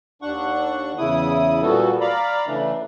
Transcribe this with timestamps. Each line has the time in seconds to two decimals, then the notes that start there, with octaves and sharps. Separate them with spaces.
0.22 D#2 D4 F#5 C#6
0.98 E2 C#3 E4 D#6
1.62 A#2 F3 G3 B3 F#4 A4
2.01 D5 F5 A#5 B5
2.47 C#3 E3 A3 D4